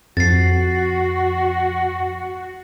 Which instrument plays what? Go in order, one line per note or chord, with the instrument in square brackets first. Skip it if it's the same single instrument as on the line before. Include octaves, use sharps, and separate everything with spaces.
[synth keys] F2 [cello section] F#4 [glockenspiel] A6 C7